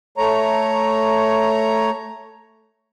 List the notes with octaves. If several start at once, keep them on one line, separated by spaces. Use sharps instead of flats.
A3 C#5 A#5